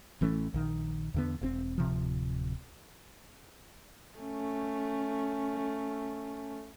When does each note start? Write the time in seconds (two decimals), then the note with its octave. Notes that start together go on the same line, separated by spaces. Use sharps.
0.21 A1 E3 A3 C#4
0.54 A#1 D#3
1.14 E2 D3 B3
1.41 E1 A2 C4
1.78 D1 C3 F3
4.18 A3 C#4